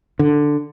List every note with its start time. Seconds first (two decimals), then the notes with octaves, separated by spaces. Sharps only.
0.19 D3